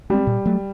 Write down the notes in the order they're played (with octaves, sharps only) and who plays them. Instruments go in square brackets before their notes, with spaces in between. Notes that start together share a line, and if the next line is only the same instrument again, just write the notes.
[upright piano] G3 [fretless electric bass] G#3 C4
[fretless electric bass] A#2
F#3 A3